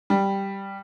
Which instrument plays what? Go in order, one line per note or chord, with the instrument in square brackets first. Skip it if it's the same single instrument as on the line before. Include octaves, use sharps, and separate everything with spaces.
[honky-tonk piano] G3